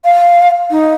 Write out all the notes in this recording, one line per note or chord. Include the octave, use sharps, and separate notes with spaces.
F5
D#4